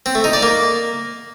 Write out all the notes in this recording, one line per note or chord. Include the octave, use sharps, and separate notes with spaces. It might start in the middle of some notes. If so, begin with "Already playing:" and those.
C4
A3
D#4
D5
A#3